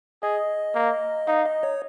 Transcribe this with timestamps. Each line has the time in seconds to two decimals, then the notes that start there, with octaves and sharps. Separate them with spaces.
0.23 G#4 D#5
0.75 A#3
1.27 D#4 F5
1.45 D#5
1.63 C#5